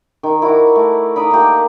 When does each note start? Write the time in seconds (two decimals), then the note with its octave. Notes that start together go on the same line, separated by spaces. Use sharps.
0.23 D#3
0.42 E4 F#4 D5
0.75 A3
1.16 D#4 D5 D#5 B5
1.31 A#3 G4